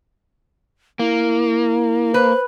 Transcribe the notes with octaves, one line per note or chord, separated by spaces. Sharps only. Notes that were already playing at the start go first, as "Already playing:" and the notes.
A#3 E4
B4 C5